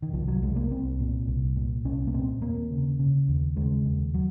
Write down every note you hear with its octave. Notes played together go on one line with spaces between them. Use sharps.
D#3
C2 F3
F#3
C2 G#3
A#3
C2 C4
A#2
C2
A#2
C2 C#4
A#3
A#2 C4
D#2 A#3
C#3
C#3
D#2
C#3 G#3
D#2
F#3